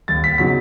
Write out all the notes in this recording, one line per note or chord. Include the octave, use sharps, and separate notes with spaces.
D#2 A6
B6
C#3 F#3 B3 D#4 B6